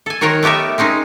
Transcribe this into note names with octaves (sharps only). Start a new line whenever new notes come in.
A4 G#5
D#3 F#4 A#4 C5 C#5
A3 B3 G4 A#4 E5
G#3 C4 C#4 D#4